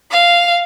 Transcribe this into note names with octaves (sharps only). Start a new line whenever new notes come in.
F5